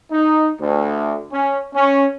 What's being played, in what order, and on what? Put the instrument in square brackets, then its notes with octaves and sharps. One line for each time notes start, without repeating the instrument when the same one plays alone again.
[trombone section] D#4
D2
C#4
C#4